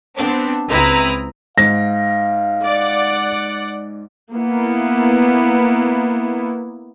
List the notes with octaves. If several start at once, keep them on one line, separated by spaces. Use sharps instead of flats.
B3 C4 D4
C#2 C4 E4 B4 A#5 D#6
G#2 F5 A#6
D5 F#5
A#3 B3 E4